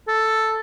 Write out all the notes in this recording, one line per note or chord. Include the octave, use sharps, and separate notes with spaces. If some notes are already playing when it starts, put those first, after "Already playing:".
A4